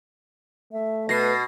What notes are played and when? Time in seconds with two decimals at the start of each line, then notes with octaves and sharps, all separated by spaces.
0.72 A3 E5
1.09 B2 B4 A#6 C7